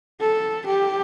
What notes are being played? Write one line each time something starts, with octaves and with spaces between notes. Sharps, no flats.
A4
G4